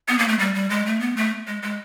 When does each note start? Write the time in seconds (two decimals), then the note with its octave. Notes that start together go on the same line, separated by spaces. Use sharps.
0.09 B3
0.19 A#3
0.28 A3
0.39 G3
0.55 G3
0.70 G#3
0.86 A3
1.01 B3
1.17 A3
1.47 G#3
1.62 G#3